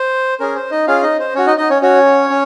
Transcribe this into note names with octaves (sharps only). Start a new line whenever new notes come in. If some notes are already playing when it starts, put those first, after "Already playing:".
Already playing: C5
C#4 G#4 A#4
C5
D#4 D#5
C#4 F4 G#4 F5
D#4 D#5
C5
C#4 F#4 C#5
D#4 D#5
D#4 D#5
C#4 C#5
C#4 F#4 C#5
C#4